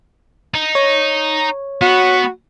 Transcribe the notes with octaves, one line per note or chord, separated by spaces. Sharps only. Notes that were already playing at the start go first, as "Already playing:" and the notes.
D#4
C#5
B3 F#4